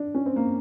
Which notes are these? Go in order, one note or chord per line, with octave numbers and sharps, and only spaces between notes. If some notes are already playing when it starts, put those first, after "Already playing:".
Already playing: D4
C#4
C4
A#3